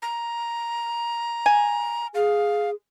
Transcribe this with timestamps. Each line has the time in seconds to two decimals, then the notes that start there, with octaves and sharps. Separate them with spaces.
0.02 A#5
1.46 G#5
2.15 G#4 F5